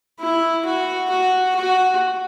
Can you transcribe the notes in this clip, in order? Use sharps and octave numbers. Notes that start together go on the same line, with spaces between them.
E4
F#4
F#4
F#4